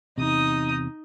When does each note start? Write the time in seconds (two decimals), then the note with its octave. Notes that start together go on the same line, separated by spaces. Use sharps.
0.18 E2 C3 D#4 D#6